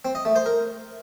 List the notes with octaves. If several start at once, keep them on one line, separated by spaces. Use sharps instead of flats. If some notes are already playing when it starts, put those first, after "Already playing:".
C4
D#5
A3
C5
A#4